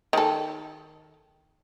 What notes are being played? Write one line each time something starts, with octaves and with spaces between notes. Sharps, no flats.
D#3 A4